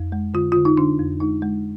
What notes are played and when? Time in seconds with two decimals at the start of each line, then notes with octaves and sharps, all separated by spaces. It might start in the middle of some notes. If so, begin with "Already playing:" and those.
Already playing: F2
0.12 G#3
0.34 D3 F4
0.52 D3 F4
0.65 D#4
0.77 D3 D4
0.99 F2
1.20 G#3 D#4
1.42 G#3